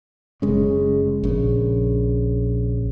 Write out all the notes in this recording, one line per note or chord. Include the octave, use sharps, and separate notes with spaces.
F#1 C#3 G#3 C#4
A#1 C#3